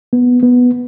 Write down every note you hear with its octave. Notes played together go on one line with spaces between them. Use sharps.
B3
B3